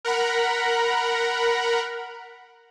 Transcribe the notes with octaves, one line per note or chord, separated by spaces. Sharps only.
A#4 F#5 A#5 B5